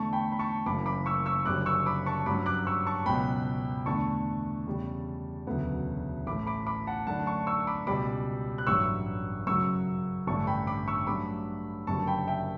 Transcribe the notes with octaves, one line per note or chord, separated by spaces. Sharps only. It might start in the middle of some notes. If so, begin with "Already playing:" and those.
Already playing: E2 D3 A3 A5 C#6
G5 B5
B5
A5 C#6
F#1 F#2 E3 B5 D6
B5 D6
C#6 E6
C#6 E6
F#1 F#2 D3 G3 C#4 D6 F#6
C#6 E6
B5 D6
A5 C#6
G2 F#3 C#4 B5 D6
D6 F#6
C#6 E6
A5 C#6
C#2 B2 F#3 G5 B5
E2 D3 A3 A5 C#6
E2 C#3 G3
E1 D2 C#3 F#3 B3
A1 A2 E3 A3 B5 D6
B5 D6
B5 D6
F#5 A5
F#2 D3 A3 D4 F#5 A5
A5 C#6
C#6 E6
B5 D6
C#2 B2 G3 B5 D6
F#6
A1 G2 F#3 C#6 E6
F#2 C#3 F#3 C#6 E6
A1 G2 D3 A3 A5 C#6
G5 B5
B5 D6
C#6 E6
G2 F#3 A3 B5 D6
F#1 F#2 D3 G3 A5 C#6
G5 B5
E5 G5